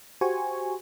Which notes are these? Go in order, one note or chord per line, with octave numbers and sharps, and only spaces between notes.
F#4 G4 C5 G#5 C#6